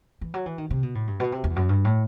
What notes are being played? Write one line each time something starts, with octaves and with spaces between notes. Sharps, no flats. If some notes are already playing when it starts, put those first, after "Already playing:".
E3
F#3
E3
D#3
C3
B2
A2
G2
B2
C3
E2
F#2
G2
A2